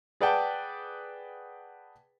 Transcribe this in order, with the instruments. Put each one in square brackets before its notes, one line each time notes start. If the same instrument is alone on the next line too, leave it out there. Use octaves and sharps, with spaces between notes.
[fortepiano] G#4 B4 D5 F#5 G5 A5